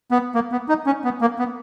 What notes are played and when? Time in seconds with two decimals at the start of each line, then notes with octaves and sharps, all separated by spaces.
0.11 B3
0.35 A#3
0.52 B3
0.68 D#4
0.86 C#4
1.04 B3
1.21 A#3
1.39 B3